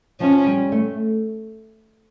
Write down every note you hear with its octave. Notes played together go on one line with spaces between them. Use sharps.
F3 C#4
G3
A3